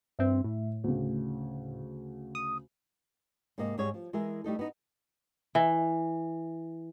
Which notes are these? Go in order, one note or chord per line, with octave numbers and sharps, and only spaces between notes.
G2 C4 E5
A2
D2 C#3
D#6
G#2 C3 A#3 D#5
G#2 G3 G#4 C#5
F3
E3 G#3 G#4 A#4 E5
G3 A3 D#4 A4
B3 D#4
E3